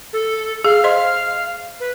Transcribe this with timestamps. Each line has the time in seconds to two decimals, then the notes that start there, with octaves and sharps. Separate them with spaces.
0.13 A4
0.65 G#4 F5
0.84 C5 D#5 C6
1.80 B4